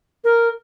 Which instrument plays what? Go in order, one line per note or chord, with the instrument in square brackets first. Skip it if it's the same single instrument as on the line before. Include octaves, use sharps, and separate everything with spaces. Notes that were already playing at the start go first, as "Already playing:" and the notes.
[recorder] A#4